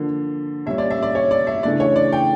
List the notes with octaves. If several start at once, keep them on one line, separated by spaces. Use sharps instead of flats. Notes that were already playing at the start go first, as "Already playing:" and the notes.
Already playing: D3 F3 A#3
A#2 G3 C#4 E5
D5
E5
D5
C#5
D5
E5
C#3 E3 A3 D4 D5
C#5
D5
G5